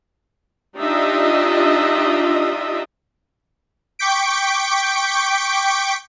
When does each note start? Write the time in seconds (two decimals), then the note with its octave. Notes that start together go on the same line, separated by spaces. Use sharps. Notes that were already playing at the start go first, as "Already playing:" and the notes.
0.78 D4 D#4 F4 G4 D#5 E5
3.99 G5 C#6 D6 G6 B6 D7